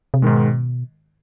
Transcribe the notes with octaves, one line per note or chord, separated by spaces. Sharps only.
C3
G#2 B2 D#3 G#3